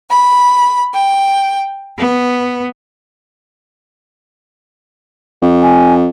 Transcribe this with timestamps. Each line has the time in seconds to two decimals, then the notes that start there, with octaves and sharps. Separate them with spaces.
0.10 B5
0.93 G5
1.98 B3
5.42 F2
5.62 G#5